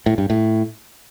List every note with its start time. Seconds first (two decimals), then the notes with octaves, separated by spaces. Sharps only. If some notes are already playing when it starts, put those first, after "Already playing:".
0.06 A2
0.18 G2
0.30 A2